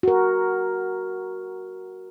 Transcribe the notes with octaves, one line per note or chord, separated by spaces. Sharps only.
F#4 A#4